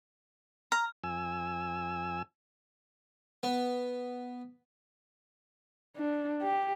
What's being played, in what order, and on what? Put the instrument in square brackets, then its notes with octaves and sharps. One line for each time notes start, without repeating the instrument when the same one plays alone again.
[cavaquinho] A#5 [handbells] F6
[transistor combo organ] F2 G#5 E6
[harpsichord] B3
[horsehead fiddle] D4
G4